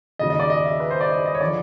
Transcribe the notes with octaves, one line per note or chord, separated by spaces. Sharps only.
D#2 C#3 F#3 D#5
D#5
D5
D#5
E5
B4
C5
D5
D#5
D#5
C#5
D3 F3 D5